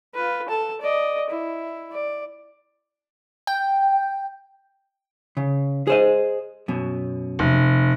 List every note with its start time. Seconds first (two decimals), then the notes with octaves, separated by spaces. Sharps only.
0.14 F4 B4
0.48 A4 A5
0.81 D5 D#5
1.30 E4
1.92 D5
3.47 G5
5.37 C#3
5.87 G#4 C5 D#5
6.68 F#2 B2
7.39 F1